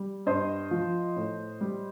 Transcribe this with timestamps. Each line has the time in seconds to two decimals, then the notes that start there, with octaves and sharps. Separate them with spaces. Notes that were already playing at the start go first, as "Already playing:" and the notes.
Already playing: G3
0.26 G2 C5 D#5
0.71 F3
1.16 A2
1.61 G3